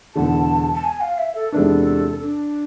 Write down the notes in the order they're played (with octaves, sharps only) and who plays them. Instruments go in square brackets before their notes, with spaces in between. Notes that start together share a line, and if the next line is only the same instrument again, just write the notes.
[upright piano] E1 E2 D3 [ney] A5
[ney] A5
G#5
F5
E5
A4
[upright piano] E2 C3 G#3 D4 [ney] A4 B4
[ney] D4